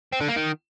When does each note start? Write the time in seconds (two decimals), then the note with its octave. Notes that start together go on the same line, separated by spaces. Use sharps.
0.13 C4
0.20 D3
0.28 A#3
0.36 D#3